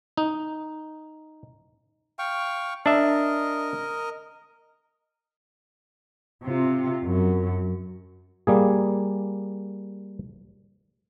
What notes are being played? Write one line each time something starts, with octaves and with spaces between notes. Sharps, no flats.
D#4
F5 G5 C#6
D4 A#4 D#5 E5
C3 F4
F#2
G3 A#3 G#4